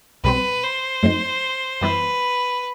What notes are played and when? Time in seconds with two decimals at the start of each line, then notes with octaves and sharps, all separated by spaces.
0.24 B1 B2 G3 C4 B4
0.63 C5
1.03 F#2 F#3 A3 C4 D#4
1.81 F#2 E3 G3 B3 E4 B4